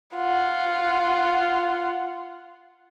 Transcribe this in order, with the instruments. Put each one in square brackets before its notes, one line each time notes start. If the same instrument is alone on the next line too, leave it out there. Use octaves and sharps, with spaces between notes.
[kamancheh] F4 F#5